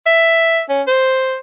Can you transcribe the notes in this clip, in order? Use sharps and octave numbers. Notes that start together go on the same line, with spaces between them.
E5
C#4
C5